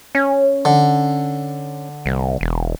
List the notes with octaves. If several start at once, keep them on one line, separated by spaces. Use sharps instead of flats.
C#4
D3
C2
E1